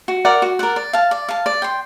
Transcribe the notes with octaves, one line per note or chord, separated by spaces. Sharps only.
F#4
A#4 D5 F#5
F#4
A#4 D5 F#5
D5
F5 A5
D5
F5 A5
D5
G5 C6